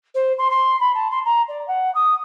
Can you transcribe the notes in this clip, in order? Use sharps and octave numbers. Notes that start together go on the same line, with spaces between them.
C5
C6
C6
B5
A5
C6
A#5
D5
F#5
D#6